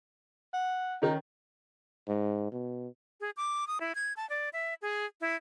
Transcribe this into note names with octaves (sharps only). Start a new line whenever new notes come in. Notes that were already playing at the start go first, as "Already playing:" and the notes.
F#5
D#3 C#4 D#4
G#2
B2
G#4
D6
D#6
E4
G#6
A5
D5
E5
G#4
E4